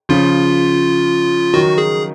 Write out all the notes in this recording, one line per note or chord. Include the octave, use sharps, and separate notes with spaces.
C#3 F3 F4
D#3 F#3 F#4
G#4